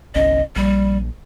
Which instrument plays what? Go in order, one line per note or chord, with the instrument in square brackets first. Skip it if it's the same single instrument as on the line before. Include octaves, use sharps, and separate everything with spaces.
[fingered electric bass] G1 C2 C#4 [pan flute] D#5
[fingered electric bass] A#1 [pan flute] G3